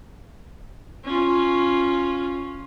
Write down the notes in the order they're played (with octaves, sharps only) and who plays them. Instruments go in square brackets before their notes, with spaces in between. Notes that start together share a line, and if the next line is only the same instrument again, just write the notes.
[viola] C#4 F4